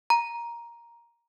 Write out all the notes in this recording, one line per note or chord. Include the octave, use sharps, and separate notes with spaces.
A#5